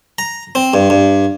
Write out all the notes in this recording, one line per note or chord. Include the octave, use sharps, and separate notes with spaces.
A#5
C4
G2
G2